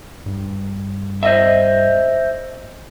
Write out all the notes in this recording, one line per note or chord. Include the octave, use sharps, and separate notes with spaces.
G2
C5 D#5 E5